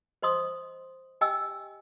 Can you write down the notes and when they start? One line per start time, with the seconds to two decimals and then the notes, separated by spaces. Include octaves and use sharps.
0.22 C5 D#5 C6 D#6
1.21 G4 D#5 G5 G#5 E6